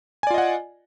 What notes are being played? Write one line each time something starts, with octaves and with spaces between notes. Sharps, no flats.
F4 D5 D#5 F#5 G#5